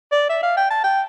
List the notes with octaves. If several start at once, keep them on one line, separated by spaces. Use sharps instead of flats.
D5
E5
F5
G5
A5
G5